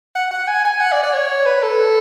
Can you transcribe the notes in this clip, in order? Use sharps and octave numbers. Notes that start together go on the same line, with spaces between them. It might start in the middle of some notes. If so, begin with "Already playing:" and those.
F#5
F#5
G#5
G#5
F#5
D5
D5
C#5
B4
A4